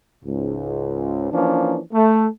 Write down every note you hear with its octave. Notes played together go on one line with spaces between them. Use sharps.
C#2 G#2
E3 F3 A#3 C#4 D4
A3